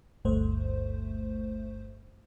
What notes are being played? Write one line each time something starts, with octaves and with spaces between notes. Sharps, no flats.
G1 D2 G2 A3 C5